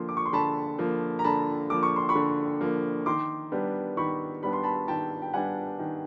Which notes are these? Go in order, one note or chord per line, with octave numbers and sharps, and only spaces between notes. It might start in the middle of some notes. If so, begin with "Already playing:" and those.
Already playing: D3 F3 A#3 C6
D6
C#6
C6
D3 A5 B5
F3 A#3
A#5
D3 A5 B5
F3 A#3 D6
C#6
C6
B5 C#6
D3
F3 A#3
D#3 C6 D6
G3 B3 D4
D#3 B5 C#6
G3 B3 D4 B5
C6
A5 B5
D#3 G5 A5
G5
G3 B3 D4 F#5 G#5
D#3